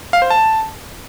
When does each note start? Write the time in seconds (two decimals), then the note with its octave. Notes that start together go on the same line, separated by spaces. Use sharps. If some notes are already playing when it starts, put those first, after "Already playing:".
0.13 F5
0.22 C5
0.30 A5